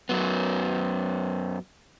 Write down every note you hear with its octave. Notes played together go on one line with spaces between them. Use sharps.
F#2 F#3 B3